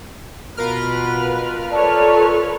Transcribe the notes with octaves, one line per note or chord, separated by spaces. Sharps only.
B2 F4 A#4 B4 F6
A4 B4 C#5 D5 A5